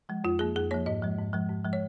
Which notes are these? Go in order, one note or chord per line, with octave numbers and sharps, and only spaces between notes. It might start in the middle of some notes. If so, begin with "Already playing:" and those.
F3 G#3
F2 F4
F3 A#3 G#4
F2 G#4
F3 A#3 C#5
G#2 D#5
F3 G#3
G#2
F3 G#3
G#2
F3 G#3
C#5